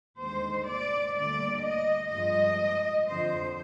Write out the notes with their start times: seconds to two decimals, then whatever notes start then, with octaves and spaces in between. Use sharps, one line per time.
0.21 D#2 D3 G#3 C5
0.69 D5
1.17 D2 D3 G3 A#3 D5
1.65 D#5
2.13 G2 F3 G#3 D#5
3.10 F2 D3 F3 C5